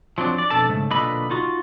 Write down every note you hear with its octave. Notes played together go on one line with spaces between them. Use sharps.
F3 F#3 C4 D4
D5
F2 B2 D4 A4 A5
G#2 C#3 A3
B1 A#2 D3 B4 D#5 B5
D#4 F4 F#4